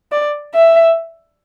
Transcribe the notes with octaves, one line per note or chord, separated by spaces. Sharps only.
D5
E5